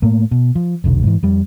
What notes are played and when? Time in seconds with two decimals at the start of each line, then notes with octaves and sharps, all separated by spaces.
0.02 A2 A3 A#3
0.31 B2
0.55 F3
0.84 F1 B1 D3 F#3
1.03 G#2 E3
1.23 F2 G3